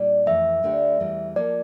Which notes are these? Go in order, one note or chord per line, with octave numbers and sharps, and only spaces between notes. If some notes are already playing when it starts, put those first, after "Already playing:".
Already playing: A#2 G3 D4
F2 E3 A3 E5
D2 D3 A3 D4 G4
E2 E3 G3
F3 A#3 F4 A4 D5